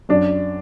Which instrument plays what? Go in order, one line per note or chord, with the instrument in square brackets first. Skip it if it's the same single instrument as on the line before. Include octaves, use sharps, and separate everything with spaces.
[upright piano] F#2 D4